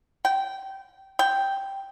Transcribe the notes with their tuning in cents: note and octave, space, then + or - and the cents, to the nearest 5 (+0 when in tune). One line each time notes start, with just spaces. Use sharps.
G5 -20
G5 +0